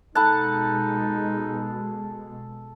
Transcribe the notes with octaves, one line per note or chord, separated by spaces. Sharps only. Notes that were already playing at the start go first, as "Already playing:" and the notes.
B2 G#3 D#4 A4 F#5 A5 B5 F#6